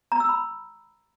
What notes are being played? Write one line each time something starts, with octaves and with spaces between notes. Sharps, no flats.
A#5
E6
B5